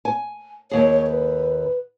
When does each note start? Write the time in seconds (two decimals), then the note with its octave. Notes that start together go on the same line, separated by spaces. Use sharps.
0.05 G#5
0.71 D#2 G#4 C#5
1.07 B4